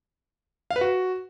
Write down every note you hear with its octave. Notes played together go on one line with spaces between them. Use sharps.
F5
B4
F#4